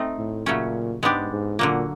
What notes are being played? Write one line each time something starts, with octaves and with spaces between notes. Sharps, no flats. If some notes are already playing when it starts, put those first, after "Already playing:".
Already playing: A3 C4 D#4
A2
A#2 C#3 F#3 A3 C#4
G#2 G#3 B3 D4 G4
G#2
A#2 D3 F#3 A#3